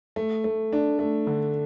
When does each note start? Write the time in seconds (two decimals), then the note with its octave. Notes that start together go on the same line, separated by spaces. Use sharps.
0.16 A3
0.44 A3
0.73 D4
0.99 A3
1.27 D3